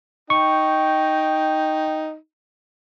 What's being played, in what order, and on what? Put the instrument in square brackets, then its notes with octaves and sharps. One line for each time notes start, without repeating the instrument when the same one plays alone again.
[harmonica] D#4 [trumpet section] G5 [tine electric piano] C#6